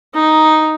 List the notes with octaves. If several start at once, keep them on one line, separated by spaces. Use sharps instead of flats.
D#4